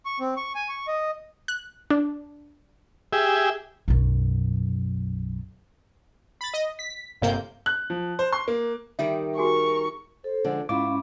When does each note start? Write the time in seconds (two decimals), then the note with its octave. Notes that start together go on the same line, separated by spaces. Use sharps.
0.05 C#6
0.20 C4
0.37 C#6
0.55 G#5
0.69 C#6
0.88 D#5
1.48 F#6
1.90 D4
3.13 G4 G#4 E5
3.88 B1 F#2
6.41 B5 A6
6.54 D#5
6.79 B6
7.22 G1 C3 A#3 G6
7.66 F#6
7.90 F3
8.19 C5
8.33 C6
8.48 A#3
8.99 D#3 G3 D#4 E5
9.38 F#4 G#4 A#4 G#5 C#6
10.24 A4 C5
10.44 D3 F3 G#3
10.69 G#2 C#4 E4 F4 F5 B5 D6